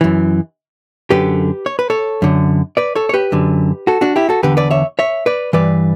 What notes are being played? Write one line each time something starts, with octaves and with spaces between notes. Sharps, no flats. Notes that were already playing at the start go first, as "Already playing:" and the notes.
F#2 E3
F#2 D3 G4 B4
C#5
B4
A4 C#5
F#2 D3
B4 D5
A4 C#5
C#5
G4 B4
F#2 D3
F#4 A4
D4 F#4
E4 G4
F#4 A4
E2 D3 G4 B4
B4 D5
C#5 E5
C#5 E5
B4 D5
G2 E3 B4 D5